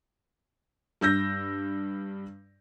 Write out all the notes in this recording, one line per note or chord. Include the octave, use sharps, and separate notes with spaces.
G2 E6 G6 A#6